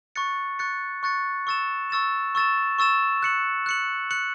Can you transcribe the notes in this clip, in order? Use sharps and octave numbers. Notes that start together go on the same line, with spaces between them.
C#6 F#6 A6 C#7
C#6 F#6 A6 C#7
C#6 F#6 A6 C#7
C#6 E6 A6 E7
C#6 E6 A6 E7
C#6 E6 A6 E7
C#6 E6 A6 E7
F#6 C#7 F#7
F#6 C#7 F#7
F#6 C#7 F#7